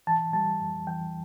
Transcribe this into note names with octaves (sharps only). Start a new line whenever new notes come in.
E3 A5
G3 A5
F2
E3 G5